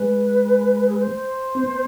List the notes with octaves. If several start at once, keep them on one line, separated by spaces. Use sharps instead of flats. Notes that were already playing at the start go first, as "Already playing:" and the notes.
Already playing: G#3 B4
G#4
B4
C5
C4
B3